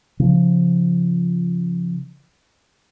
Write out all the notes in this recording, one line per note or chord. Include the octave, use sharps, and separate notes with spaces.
C#3 F3